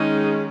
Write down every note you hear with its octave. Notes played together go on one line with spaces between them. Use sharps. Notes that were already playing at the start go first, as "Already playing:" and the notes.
Already playing: D#3 G#3 C#4 D#4